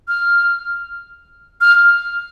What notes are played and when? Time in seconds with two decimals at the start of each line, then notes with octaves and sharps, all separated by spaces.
0.08 F6
1.61 F6